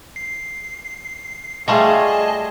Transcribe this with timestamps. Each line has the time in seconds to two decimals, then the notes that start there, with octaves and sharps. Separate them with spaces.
0.16 C7
1.68 G3 A3 F4 G#4 D#5 A5